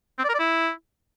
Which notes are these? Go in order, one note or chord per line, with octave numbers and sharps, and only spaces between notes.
C4
D5
A#4
D5
E4